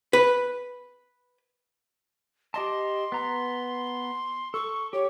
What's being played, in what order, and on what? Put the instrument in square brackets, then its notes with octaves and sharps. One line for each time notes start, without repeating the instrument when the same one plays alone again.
[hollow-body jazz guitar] B4
[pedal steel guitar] G4 D#5 A5 [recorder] C6
[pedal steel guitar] B3 A#5
[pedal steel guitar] A4 [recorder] C#6
[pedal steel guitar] G4 [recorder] C#5